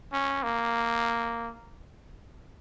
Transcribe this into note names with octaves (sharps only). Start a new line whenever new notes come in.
C#4
A#3